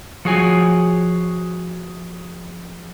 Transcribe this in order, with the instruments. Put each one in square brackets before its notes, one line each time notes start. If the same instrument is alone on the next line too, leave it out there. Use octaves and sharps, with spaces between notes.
[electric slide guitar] F3 F#4 G#4 C#5 G#5